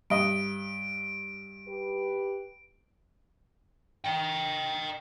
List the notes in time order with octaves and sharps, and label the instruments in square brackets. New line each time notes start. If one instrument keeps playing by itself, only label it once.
[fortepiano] G2 D#5 [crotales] D7
[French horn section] G4 B4
[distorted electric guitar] D#5 G5